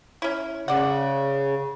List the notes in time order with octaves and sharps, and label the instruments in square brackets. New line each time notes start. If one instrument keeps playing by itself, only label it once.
[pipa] C#4 E4
[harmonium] C#3 [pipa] D5 F#5